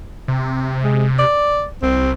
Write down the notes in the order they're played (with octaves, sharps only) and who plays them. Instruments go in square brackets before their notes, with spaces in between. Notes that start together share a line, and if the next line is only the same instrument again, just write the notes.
[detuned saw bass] C3
[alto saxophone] G#3
D5
[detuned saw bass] C2 [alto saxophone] C4